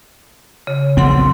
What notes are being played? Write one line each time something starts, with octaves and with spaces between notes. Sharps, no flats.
C#3
A#1 E2 F#3 C4 F#5 C6